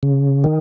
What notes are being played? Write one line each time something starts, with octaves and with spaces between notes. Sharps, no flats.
C#3
D#3